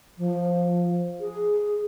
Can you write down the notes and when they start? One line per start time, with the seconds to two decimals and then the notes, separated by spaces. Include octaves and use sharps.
0.17 F3
1.20 G#4